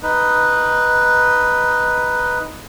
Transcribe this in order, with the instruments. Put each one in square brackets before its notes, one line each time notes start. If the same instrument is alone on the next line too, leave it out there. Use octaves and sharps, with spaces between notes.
[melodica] D#4 B4